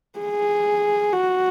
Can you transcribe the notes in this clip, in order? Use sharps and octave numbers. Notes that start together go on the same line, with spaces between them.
G#4
F#4